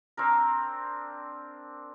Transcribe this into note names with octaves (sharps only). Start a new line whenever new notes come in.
C4 D4 A#4